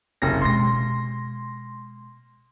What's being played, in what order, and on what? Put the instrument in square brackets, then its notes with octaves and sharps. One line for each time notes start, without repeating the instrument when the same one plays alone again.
[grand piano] F#1 C3 A#6
[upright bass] B2 G#3 [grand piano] C6 A#6